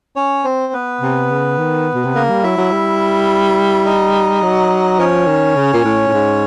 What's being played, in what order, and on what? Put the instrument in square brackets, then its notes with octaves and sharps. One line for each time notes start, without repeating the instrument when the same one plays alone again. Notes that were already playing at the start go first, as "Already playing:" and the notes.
[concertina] C#4 C#5
C4 C5
B3 B4
[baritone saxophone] C3
C#3
D#3
B2
C3
[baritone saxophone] C#3 [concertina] A#3 A#4
[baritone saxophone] G3
[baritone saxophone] F#3 [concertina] E4 E5
[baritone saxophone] F#3
G3
[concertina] D#4 D#5
[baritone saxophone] F#3
[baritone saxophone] F3 [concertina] C#4 C#5
[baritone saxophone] D#3
C#3
A#2
A2
A2
G#2